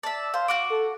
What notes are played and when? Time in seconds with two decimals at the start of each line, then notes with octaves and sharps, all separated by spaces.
0.03 D5 E5 A5
0.34 C5 F5
0.48 F#4 F#5 D6
0.70 A4